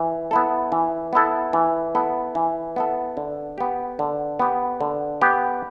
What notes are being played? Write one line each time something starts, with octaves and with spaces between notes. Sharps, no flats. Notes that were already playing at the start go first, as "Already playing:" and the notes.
Already playing: E3
B3 E4 A4
E3
B3 E4 A4
E3
B3 E4 A4
E3
B3 E4 A4
D3
B3 G4
D3
B3 G4
D3
B3 G4